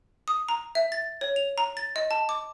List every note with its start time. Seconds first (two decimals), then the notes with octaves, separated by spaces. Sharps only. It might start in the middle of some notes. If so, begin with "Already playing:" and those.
0.28 D#6
0.49 A#5
0.75 E5
0.92 A6
1.21 C#5
1.36 F7
1.58 A#5
1.77 A6
1.96 D#5
2.11 A5
2.29 D6